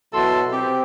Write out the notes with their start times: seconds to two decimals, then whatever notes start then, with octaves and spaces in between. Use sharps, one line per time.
0.13 B2 F#3 E4 A4 A5 C6
0.51 C4 G4